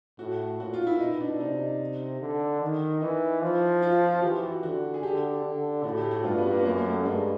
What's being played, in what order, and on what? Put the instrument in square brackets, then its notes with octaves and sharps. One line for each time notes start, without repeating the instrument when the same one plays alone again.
[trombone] A2 [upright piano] F#4
[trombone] A#2 [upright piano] F#4
[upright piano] F4
E4
[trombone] B2 [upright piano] D#4
[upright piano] D4
[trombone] C3 [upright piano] D#4
[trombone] D3
D#3
[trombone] E3 [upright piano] D#4
[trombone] F3
[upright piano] F4
F#4
[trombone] E3 [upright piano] G4
[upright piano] F#4
[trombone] D3 [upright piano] F#4
[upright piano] G#4
[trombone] D3 [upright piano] G4
[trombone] D3
[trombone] A2 [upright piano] F#4
[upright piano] G4
F#4
[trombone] G2 [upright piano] F4
[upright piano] B3
A#3
B3
[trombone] F#2 [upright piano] A#3
[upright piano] A3
[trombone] G2 [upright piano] G#3